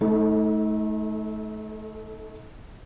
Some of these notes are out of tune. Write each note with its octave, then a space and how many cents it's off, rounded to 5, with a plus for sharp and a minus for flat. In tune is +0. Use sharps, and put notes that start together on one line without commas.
A3 -30 D#4 +30 A4 +0